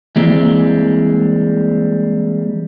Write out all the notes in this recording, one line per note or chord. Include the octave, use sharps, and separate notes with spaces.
E3 G3 G#3 A#3 C4